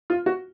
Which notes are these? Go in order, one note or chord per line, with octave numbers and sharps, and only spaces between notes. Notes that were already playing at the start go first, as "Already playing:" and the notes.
F4
F#4